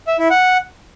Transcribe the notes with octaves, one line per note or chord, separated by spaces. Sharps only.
E5
E4
F#5